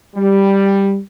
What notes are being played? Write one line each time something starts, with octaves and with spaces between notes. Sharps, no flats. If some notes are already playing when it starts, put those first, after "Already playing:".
G3